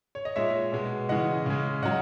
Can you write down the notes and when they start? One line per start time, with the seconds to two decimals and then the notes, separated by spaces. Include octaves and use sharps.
0.15 C#5
0.25 D#5
0.36 A#2 G#3 C#5 E5
0.72 B2 G#3
1.09 C#3 E3 G#3 D#5 F#5
1.46 C#3 G#3
1.83 C#3 F#3 D#5 F#5